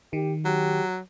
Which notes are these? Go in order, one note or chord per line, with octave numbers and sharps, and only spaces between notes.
D#3 G4
F#3 G4